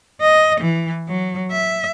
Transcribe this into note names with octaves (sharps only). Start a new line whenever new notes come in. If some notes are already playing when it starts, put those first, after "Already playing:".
D#5
E3
F#3
E5